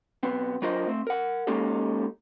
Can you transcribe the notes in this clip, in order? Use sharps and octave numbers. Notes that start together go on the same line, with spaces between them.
B1 B3 C4
F#3 D4 F4 A#4 C5 D#5
A3 C4
A#4 F#5
G#3 A#3 C#4 D#4 G4 A4